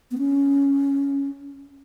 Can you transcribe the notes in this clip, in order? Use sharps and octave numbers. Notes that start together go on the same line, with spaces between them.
B3
C#4